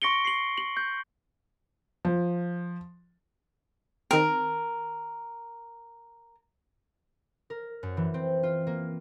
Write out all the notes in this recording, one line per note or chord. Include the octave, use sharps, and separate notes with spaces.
C6 C#6 A#6 C#7 D7 G7
C7 F#7
F#7
G6
F3
D#3 C4 A#4
A#4
F#2
E3
C4
F4
A#3